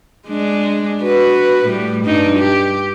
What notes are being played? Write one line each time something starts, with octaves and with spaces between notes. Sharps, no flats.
G#3 D4
F#4 B4
A2 G3
G2 D4 D#4
G4